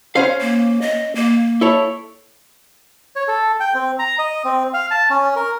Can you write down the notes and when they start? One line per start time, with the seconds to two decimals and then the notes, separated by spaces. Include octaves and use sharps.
0.16 C#4 C5 F5
0.41 A#3
0.82 D#5
1.15 A#3
1.61 E4 A4 C#5
3.16 C#5
3.28 A4
3.60 G5
3.74 C4
3.99 A#5
4.19 D#5
4.45 C4
4.74 F5
4.91 A5
5.10 C#4
5.36 A#4